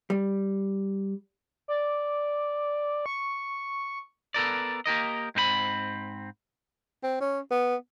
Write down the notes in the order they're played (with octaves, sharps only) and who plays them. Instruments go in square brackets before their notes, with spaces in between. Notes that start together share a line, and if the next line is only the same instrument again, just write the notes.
[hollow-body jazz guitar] G3
[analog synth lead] D5
C#6
[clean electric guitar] B3 A4 A#4 D5
A#3 G4 A#4 D#5
G#2 C4 A#4 B5
[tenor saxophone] C4
C#4
B3